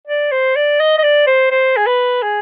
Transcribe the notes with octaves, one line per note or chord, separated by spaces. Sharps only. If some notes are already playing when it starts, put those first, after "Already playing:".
D5
C5
D5
D#5
D#5
D5
C5
C5
G#4
B4
G#4